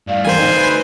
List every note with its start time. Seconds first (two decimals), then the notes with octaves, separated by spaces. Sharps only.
0.07 G2 A3 D5 F5
0.25 E2 G3 A#4 C5 G#5
0.39 A3 D4 D#4
0.53 B4